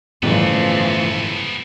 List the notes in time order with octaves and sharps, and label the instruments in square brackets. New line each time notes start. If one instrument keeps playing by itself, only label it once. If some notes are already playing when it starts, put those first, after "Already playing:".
[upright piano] G1 C#3 [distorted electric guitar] C#2 B3 [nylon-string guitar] A2 [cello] E3 F3